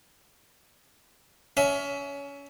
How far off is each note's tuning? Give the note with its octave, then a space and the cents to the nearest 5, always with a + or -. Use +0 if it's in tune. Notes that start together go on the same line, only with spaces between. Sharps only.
C#4 +25 E5 +0